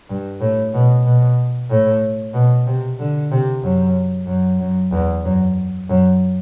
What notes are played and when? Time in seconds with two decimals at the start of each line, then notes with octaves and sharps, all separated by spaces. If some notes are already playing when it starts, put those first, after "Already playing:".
0.09 G2
0.41 A2
0.74 B2
1.05 B2
1.70 A2
2.34 B2
2.66 C3
2.99 D3
3.31 C3
3.63 F#2
4.27 F#2
4.59 F#2
4.92 E2
5.24 F#2
5.89 F#2